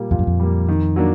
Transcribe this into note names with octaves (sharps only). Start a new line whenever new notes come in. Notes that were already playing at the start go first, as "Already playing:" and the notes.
Already playing: A#2 G3 A#3
F2 A#2
F#2
F2
G3 A#3
D#3
F#3 A#3 D4